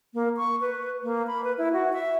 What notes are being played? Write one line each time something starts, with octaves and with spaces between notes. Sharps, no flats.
A#3
C#6
B4
A#3
B5
B4
E4
F#4
E5